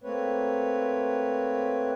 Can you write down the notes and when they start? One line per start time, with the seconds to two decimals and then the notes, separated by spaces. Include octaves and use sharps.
0.04 A3 A#3 C4 B4 C#5